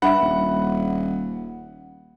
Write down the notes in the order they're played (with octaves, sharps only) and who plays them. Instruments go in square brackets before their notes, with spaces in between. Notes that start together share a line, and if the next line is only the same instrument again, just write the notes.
[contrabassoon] G2 [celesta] E5 B5 [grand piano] F#5
[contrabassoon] D#1